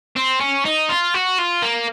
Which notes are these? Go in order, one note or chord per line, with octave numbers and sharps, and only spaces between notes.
C4
C#4
D#4
F4
F#4
F4
A#3